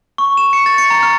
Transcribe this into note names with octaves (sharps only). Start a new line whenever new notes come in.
C#6
E7
C#7
A6
C#7
A#5
F6